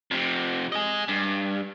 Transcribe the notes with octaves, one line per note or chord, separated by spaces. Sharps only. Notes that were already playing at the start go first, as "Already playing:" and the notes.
F2 C3
G#4 D#5
G2